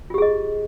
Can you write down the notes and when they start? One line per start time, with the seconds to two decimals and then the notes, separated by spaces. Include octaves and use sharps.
0.10 F4
0.14 G4
0.18 G#4
0.22 D#5